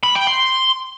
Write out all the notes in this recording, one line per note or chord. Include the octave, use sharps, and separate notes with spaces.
B5
G5
C6